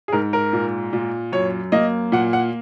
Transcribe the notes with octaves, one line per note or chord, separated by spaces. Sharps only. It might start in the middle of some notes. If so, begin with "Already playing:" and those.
G#4
G#2 A#4
A#4
A#2
A#2
F#2 C#5
A#3 D#5
A#2 F#5
F#5